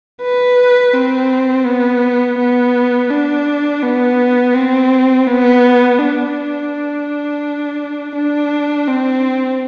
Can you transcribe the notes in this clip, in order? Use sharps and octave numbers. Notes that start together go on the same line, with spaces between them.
B4
C4
B3
B3
D4
B3
C4
B3
D4
D4
C4